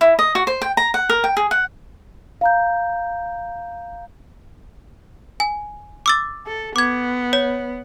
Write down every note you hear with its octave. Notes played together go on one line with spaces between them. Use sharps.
E4
D#5
F#4
C5
G5
A#5
F#5
A#4
G5
G#4
F#5
F5 A#5 G6
G#5
D6 E6 A6
A4
B3 D6 G#6
C#5